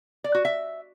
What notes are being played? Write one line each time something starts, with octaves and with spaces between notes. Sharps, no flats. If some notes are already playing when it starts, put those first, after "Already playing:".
D5
F#4
E5